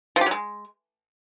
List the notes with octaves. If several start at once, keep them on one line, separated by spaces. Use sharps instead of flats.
F3
G4
F#3
G#3